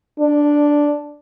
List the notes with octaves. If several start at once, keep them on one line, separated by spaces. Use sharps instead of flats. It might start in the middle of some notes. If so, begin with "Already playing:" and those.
D4